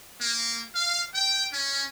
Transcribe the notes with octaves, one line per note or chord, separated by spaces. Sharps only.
A#3
F5
G5
C#4